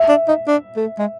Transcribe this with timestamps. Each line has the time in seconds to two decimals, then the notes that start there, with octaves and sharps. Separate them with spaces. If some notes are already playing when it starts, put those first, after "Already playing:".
Already playing: E5
0.08 D4
0.28 D#4
0.47 D4
0.77 A3
0.99 G#3